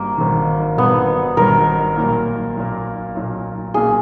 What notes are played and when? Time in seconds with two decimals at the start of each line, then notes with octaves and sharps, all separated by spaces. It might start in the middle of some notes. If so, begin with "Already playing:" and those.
Already playing: G#1 G2 D#3 A#3
0.18 G#1 G2 D#3
0.77 G#1 G2 D#3 B3
1.37 G#1 G2 D#3 A#4
1.96 B1 A#2 A#3
2.56 B1 A#2 A#3
3.15 B1 A#2 A#3
3.74 B1 A#2 A#3 G#4